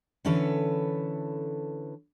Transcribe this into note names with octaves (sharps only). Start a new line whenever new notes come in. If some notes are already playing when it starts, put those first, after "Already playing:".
D3 E3 C#4 A4 B4